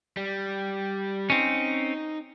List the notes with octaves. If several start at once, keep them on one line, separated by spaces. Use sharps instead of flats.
G3
C4 C#4 D#4